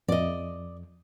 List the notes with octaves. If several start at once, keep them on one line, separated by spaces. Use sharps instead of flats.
F2 D5 D#5